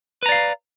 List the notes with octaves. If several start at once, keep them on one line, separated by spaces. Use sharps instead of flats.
B4 D5 F5 A#5